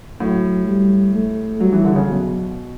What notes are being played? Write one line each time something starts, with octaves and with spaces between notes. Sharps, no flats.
A2 F#3
G3
A3
F#3 G3
E3
D3
C#3
B2 F#3